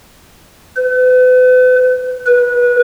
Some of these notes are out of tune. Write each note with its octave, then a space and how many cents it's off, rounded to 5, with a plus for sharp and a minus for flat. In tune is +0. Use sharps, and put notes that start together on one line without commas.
B4 +40
B4 -25